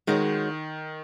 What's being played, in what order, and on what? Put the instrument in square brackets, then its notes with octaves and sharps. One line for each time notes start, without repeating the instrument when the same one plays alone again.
[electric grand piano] D#3 [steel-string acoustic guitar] G#3 D#4 F#4 C#5